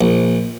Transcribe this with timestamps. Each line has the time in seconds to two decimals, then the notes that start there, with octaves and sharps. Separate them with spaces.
0.01 A#1